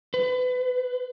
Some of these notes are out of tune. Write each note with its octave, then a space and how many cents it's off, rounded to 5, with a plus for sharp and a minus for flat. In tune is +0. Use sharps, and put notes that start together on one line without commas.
B4 +30